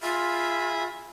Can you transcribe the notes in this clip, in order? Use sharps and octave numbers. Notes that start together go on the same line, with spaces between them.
F4 G#4 E5 B5